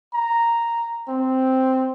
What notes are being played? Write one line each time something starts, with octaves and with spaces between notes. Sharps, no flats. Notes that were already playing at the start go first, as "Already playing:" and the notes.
A#5
C4